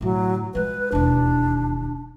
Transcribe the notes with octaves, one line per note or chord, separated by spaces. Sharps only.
A2 D3 F#3
F3 G#3 B4
E1 D#2 D4